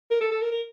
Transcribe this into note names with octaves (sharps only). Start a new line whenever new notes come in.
A#4
A4
A4
A#4
A#4